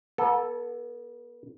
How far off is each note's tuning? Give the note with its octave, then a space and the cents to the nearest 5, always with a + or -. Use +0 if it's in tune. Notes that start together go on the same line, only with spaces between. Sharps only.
B3 -40 A4 +0